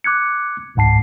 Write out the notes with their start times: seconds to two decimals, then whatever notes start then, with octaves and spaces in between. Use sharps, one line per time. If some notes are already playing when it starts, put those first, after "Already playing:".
0.04 D6 F#6 G#6 C#7
0.75 G#1 C#2 G#2 F#5 A5 C7